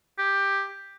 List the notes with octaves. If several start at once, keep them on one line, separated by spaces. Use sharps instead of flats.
G4